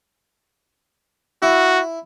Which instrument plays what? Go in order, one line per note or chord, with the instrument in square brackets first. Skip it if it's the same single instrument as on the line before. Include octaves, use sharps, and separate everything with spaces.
[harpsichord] E4 [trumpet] F#4